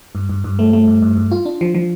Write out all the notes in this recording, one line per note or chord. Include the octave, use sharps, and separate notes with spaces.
G2
G2
G2
A3
A3
G2
G2
G2
F4
D4
F3
F3